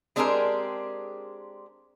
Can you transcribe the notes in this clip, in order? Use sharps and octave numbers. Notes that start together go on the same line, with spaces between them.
G#3 C4 D4 G4 G#4 A#4